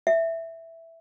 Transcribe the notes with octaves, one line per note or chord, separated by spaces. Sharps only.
E5